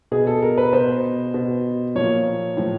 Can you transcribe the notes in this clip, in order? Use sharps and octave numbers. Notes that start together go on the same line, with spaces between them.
B2 G#4
A4
A#4
B4
B2 C5
B2
A#2 F3 C#5
A2 F3